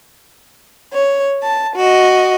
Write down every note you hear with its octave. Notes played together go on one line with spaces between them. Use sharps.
C#5
A5
F#4 D#5